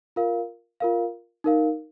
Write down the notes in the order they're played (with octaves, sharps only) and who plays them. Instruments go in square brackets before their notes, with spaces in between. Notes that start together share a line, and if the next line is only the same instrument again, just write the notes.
[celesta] F4 A#4 F5
F4 A#4 F5
D#4 A#4 F5